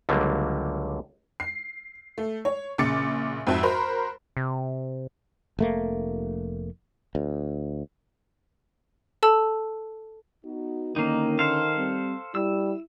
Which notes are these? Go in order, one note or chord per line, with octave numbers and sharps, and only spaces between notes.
C#2 D3 F#3 G3 A#3
C7
A3
C#5
A#1 C#3 D6 A6 C#7
F2 G#2 C4 F#4 E5 A5
F#4 A#4 C5 A#5 B5
C3
F1 A3 A#3
D2
A4 A5 E6
B3 D#4 F#4
D3 D#3 A#3 C#4 D#4
A4 C5 F5
G3 C4
G3 E4 E6